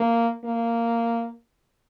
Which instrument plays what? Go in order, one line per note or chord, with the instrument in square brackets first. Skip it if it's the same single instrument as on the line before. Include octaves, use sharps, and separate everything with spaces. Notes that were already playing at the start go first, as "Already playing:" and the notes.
Already playing: [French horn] A#3
A#3